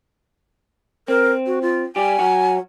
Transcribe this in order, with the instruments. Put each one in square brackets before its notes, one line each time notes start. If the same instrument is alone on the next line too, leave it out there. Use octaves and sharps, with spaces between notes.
[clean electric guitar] C4 [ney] A#4
[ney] F#4
F4
[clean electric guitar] G3 G4 [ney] G#5
[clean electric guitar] F#3 F#4